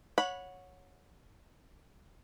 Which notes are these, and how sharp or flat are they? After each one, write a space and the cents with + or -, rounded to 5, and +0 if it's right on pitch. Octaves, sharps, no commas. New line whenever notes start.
C#5 +0 F#5 -20 B5 +0